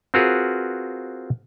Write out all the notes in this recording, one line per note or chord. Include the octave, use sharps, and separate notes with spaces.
C4 F4 F#4 G#4 A#4 B4